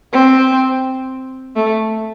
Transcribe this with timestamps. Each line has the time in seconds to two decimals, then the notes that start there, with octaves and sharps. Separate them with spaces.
0.13 C4
1.56 A3